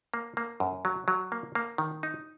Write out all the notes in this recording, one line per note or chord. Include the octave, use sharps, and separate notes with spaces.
A#3
A#3
F#2
F#3
F#3
A#3
A#3
D#3
D#4